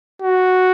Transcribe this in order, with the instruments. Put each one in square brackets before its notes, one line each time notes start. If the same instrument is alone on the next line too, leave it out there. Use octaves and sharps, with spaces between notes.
[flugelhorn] F#4